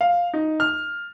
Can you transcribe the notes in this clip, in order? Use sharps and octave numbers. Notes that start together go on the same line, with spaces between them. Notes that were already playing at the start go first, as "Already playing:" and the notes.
F5
D#4
F6